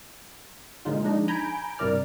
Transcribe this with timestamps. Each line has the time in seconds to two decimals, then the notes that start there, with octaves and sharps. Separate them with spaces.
0.85 A#2 D3 G#3 D#4 F4
1.02 F3 G#3 D4 D#4
1.28 G#5 A#5 B5 G6 D7
1.79 G2 C3 E4 A#4 D5 F6